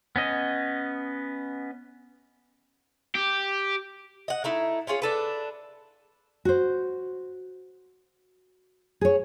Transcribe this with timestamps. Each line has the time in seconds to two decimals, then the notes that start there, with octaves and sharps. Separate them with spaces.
0.16 B3 C#4 D#5
3.15 G4
4.28 D#5 F#5
4.44 A3 D#4 E4
4.87 C#4 F4 G#4 C#5
5.02 D4 A4 B4
6.45 F#4 C5
9.01 G#4 C#5